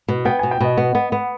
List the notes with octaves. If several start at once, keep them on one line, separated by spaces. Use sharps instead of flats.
B2
B3 G5
B2 G#5
G5
B2 D#5
B3
B3
B3